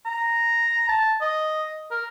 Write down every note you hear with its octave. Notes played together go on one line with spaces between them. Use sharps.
A#5
A5
D#5
A#4